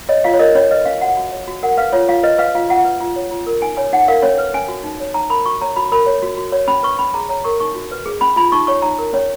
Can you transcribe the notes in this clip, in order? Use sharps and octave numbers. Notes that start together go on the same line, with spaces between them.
C#5 D#5
F4 F5
C#5
A#4 D#5
C#4 C#5
B4 D#5
C#4 F5
F#4 F#5
F#4
C#5
F#4
A#4 F#5
B4 F5
F4 C#5
F4 F5
B4 D#5
B4 F5
F4 F5
F4 F#5
B4
F4
C#5
F4
A#4
D#4 G#5
C#5 G#5
D#4 F#5
A#4 F5
C#4 C#5
B4
C#4 G#5
F#4
D#4
C#5
D#4 A#5
A#4 B5
F#4 C#6
C#5 A#5
F#4 B5
A#4 B5
C#5
F#4
F#4
C#5
C#4 B5
B4 C#6
C#4 B5
G#4 A#5
C#5 A#5
A#4 C#6
D#4 C#6
F#4
B4
G#4
C#4 B5
F4 B5
D#4 C#6
C#5 C#6
D#4 A#5
A#4
C#4 C#5